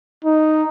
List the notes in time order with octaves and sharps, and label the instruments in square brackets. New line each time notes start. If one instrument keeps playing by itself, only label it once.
[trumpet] D#4